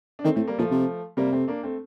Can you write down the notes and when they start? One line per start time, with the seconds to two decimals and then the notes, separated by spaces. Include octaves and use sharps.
0.19 D4
0.24 D#3 A3 C4
0.36 A2 A3 C4
0.47 G3 A#3
0.59 A#2 F3 A3
0.71 C3
1.17 C3 G3 A#3
1.32 A3 C4
1.48 A#3 D4
1.63 A3 C4